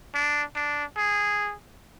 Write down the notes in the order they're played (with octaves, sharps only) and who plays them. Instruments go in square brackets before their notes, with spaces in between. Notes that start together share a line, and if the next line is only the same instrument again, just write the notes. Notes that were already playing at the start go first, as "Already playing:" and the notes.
[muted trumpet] D4
D4
G#4